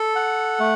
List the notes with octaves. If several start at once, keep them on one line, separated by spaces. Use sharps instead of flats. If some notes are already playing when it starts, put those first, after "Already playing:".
Already playing: A4
F#5
A3